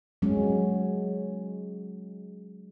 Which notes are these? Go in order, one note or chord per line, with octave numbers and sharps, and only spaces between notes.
F#3 G#3 C#4